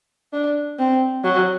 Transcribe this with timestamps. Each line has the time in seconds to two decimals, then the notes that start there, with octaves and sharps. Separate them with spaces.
0.33 D4
0.79 C4
1.24 F#3